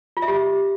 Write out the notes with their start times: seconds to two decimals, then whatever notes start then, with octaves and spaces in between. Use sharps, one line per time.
0.17 F4
0.22 E5
0.28 G4